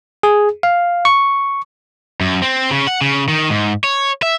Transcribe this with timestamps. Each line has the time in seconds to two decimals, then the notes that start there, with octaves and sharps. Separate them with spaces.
0.23 G#4
0.63 F5
1.05 C#6
2.21 F#2
2.42 C4
2.71 C#3
2.87 F#5
3.01 C#3
3.29 D#3
3.50 G#2
3.84 C#5
4.22 E5